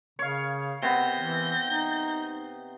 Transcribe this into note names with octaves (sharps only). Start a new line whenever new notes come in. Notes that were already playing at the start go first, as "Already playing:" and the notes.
C#3 C#5 F5
C3 B3 G6 A#6
E3
D#4